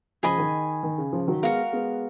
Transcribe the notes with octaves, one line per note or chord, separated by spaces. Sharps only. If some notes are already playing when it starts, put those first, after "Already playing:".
C#3 F3 G#4 D#5 G#5 B5
D#3
D#3
C#3
C#3 F3
D#3 F#3
G#3 B3 F#4 A#4 F5
G#3 B3